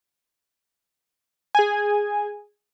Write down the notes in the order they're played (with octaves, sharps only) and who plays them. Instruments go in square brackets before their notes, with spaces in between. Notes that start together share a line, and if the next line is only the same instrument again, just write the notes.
[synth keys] G#4 G#5